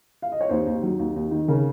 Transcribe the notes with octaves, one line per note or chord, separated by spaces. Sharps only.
F5
D#5
C#5
D#2 C5
D#2
F#3
D#2
D#2
D#3
C#3 A#4